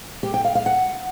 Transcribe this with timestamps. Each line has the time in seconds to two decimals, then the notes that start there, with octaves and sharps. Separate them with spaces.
0.23 G4
0.34 G5
0.44 F5
0.55 F5
0.66 F#5